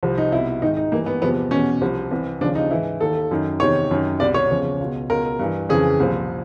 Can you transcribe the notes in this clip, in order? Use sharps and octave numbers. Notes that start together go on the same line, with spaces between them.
C2 C3 F3
D#4
C2 B2 E4
G#2 D#3 D#4
D#4
G2 E3 A#3
B3
E2 C3 F3 B3
E2 B2 C#4
C2 C3 F3
C2 C3 E3
D#2 C#3 F3 D4
D#4
G#2 E3 E4
D#2 D#3 A4
F#2 D#3
E2 C3 D#3 C#5
F#2 D#3
C2 B2 D5
C#5
E2 C#3 F3
C#2 B2
C#2 B2 A#4
G2 E3
F2 C#3 E3 G#4
C2 A#2 F3